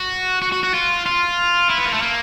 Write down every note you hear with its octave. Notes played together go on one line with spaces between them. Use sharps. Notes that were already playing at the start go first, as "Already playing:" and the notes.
Already playing: F#4
F#4
F#4
F#4
F4
F4
E4
B3
A#3
A3
A#3